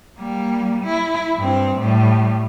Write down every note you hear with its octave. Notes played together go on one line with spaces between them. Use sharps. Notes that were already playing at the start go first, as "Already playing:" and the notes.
G3 A#3
E4
G2 C4
A2 G3